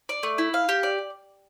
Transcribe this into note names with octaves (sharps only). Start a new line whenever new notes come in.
D5
A3
E4
F5
G4
D5